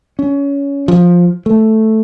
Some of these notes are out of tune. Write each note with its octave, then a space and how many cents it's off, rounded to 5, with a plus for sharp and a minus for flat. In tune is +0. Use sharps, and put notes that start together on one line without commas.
C#4 +20
F3 +10
A3 +0